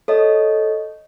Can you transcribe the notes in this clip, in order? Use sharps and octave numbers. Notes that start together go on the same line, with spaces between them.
A4 C#5 D#5